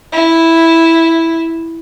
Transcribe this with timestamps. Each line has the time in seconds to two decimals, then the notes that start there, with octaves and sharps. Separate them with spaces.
0.13 E4